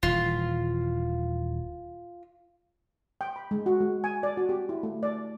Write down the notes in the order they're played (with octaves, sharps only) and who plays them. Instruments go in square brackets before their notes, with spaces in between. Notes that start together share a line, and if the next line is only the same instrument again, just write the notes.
[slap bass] D#1 E3 [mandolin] F4
[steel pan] G5
B5
G#3
F#4
G#3
G#5
D5
F#4
G4
E4
A3
D5